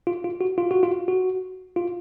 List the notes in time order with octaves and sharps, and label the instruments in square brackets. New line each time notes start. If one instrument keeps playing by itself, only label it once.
[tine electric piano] F4
F4
F#4
F4
F#4
F4
F#4
F4